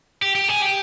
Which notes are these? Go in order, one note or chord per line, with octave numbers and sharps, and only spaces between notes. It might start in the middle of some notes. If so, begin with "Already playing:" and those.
G4
G4
G#4
G4